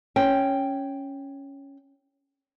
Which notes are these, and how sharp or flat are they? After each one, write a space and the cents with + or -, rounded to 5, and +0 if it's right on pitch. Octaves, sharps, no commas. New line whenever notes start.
C#4 +0 G5 +0